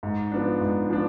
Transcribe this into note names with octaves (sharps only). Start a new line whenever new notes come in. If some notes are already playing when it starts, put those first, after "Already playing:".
G#2
F3 B3 D4
G#2
F3 B3 D4